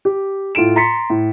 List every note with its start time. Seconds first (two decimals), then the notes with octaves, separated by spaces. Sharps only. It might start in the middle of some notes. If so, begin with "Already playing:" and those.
0.05 G4
0.55 A2 F4 A4 D7 E7
0.76 A#5 C6 A6 B6 C#7
1.10 A2